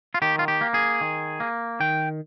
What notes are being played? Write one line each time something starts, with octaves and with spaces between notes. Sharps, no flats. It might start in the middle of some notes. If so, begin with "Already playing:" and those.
F4
D#3 G4
F4
G4
A#3
G#4
D#3
A#3
D#3 G5